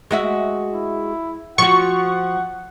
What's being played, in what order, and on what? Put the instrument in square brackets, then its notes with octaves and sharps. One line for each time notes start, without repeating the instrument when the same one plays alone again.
[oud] G#3 F#4 E5
[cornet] E4
[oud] F3 F#4 [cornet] F#5 [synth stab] C#6